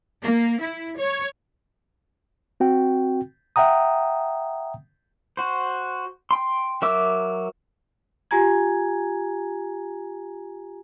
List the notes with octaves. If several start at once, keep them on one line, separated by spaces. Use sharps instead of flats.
A#3
E4
C#5
C4 F#4 G5
E5 F#5 G5 A#5 D#6
F#4 C5
G5 C6
F#3 A#4 E5 D6 E6
F4 G4 G#5 A#5 G#6